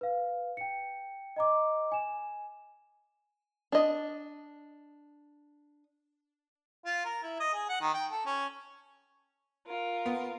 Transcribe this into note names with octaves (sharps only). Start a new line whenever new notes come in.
B4 F5
G5 C#7
D#5 A#5 D6
G#5 E7
D4 D#5
F4
A#4
E4
D#5
G#4
F#5
D#3
G5
A4
C#4
F4 A#4
B3